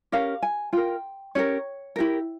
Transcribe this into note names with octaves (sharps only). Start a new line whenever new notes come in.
C#4 G4 A#4 F5
G#5
F4 A#4 G5
C#4 G4 A#4 C#5
E4 G4 A#4